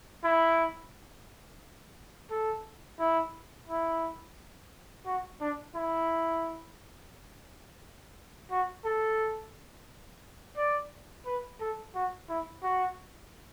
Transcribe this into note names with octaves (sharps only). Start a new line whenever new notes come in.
E4
A4
E4
E4
F#4
D4
E4
F#4
A4
D5
B4
A4
F#4
E4
F#4